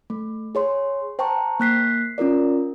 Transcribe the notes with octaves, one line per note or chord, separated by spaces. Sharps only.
A3
G#4 C#5 C6
C5 G5 A5 A#5 C#6
A#3 F#6 B6 C7
C#4 F4 A#4 D5